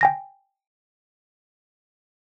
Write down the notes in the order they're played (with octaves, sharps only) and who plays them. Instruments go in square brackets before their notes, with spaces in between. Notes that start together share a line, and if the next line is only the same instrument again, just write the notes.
[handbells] G5 G#5 A#6